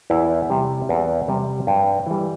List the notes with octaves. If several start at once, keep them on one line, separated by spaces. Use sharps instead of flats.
E2 E4
C3 G3
E2
C3 G3
G2
E3 G3